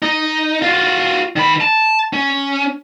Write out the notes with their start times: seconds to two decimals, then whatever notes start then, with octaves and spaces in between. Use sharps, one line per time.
0.02 D#4
0.62 F4 F#4
1.36 D#3 B5
1.61 A5
2.13 C#4